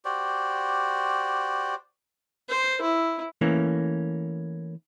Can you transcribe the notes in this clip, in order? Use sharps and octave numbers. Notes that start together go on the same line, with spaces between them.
F#4 G4 C5 D5
C5
E4
E3 A3 A#3 C#4